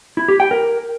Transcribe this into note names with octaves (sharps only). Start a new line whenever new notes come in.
E4
G4
G5
A#4